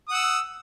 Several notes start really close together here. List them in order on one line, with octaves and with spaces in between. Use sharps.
D#6 F#5 E6